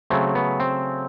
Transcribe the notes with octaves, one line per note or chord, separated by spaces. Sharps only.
C#3 F#3 A3 C4
B3
C4